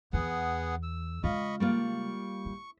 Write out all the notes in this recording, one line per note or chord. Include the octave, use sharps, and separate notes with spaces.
E2 B3 G#4 F#5
E6
C#3 G#3 F4 D#5 B5 C#6
G3 A#3 F4 C#6
E4